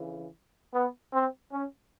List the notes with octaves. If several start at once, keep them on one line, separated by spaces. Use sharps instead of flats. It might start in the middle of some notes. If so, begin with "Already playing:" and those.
Already playing: F2 C#3 E3
B3
C4
C#4